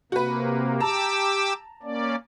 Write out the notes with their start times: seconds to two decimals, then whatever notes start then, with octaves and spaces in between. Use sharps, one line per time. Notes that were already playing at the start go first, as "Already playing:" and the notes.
0.12 C3 A#3 F#4 B4
0.80 G4 A5 A#5 D6 E6
1.83 A#3 C#4 D5